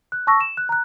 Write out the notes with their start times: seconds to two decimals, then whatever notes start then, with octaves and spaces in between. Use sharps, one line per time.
0.12 F#6
0.27 A5 C#6 E6 A#6
0.41 E7
0.57 F#6
0.69 A#5 F#6